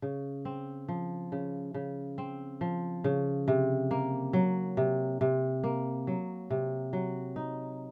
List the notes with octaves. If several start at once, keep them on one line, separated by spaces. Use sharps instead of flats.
C#3
C4
F3
C#3
C#3
C4
F3
C#3
C3
A#3
F#3
C3
C3
A#3
F#3
C3
F#3
D#4